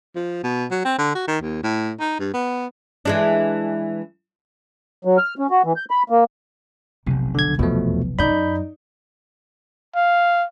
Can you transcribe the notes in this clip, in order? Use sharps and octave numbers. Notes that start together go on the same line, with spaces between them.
F3
B2
F#3
C4
D3
F#4
D#3
D#2
A2
D#4
G2
B3
E3 G#3 D4
F#3
F6
C#4
F#4
E3
G6
B5
A#3
F1 B1 C3
D3 G#6
E2 B2 F3 A3
F#2 D#4 D5 B5 G6
F5